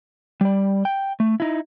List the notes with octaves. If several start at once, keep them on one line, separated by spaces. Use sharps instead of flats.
G3 D5
G5
A3
D#4 E4